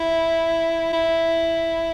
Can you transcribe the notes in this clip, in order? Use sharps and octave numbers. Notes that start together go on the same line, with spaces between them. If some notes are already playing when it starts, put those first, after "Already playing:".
Already playing: E4
E4